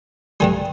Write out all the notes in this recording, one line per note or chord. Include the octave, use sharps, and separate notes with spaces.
G2 D3 G3 G#5